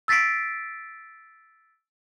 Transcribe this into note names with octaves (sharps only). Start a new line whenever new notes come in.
E6 A6 B6 C7 D7